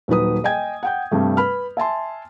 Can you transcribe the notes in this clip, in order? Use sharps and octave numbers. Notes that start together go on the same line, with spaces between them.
D#1 F#3 D#4 B4 D#6
D#5 G5 G#5 G#6
F#5 G5 G6
G2 C3 G3 A3
B4 B5 F6
E5 G#5 A5 C6